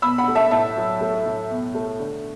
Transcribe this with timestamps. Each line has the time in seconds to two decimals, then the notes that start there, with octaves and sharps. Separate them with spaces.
0.02 B2 B5 E6
0.18 F#5 B5
0.28 A3
0.35 E5 A5
0.51 A2 E5 A5
0.77 F#3
1.01 A3
1.26 A2
1.50 B2
1.75 A3
2.00 D3